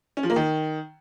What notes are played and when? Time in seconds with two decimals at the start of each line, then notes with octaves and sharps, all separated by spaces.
0.17 C#4
0.23 F3
0.30 A#3
0.36 D#3